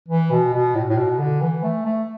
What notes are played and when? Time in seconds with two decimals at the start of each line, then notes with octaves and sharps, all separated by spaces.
0.09 E3
0.31 B2
0.53 B2
0.75 A2
0.90 A2
0.98 B2
1.19 D3
1.41 E3
1.63 A3
1.85 A3